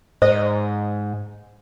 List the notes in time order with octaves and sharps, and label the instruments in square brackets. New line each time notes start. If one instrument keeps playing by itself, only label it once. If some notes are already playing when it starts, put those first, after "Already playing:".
[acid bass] G#2 [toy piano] C5 [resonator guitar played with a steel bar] D#5